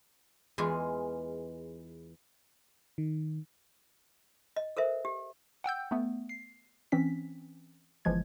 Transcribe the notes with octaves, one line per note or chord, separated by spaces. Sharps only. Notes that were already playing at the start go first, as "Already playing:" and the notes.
E2 E3 G#3 F4 G#4 G#5
D#3
D#5
A4 A#4 C5 E5
G4
F#5 G5 E6 G6
A3 B3
C7
E3 C4 C#4 B6
G1 E3 F3 G#3 G#6